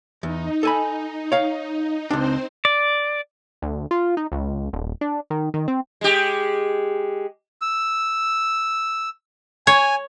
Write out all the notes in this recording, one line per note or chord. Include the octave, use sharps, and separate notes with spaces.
E2 D#4
A4 G#5 B5
C#5 F5
C#2 C4 D4 C5
D5
D2
F4
D#4
C#2
D#1
D4
D#3
D#3
C4
G#3 G4
E6
C#5 G#5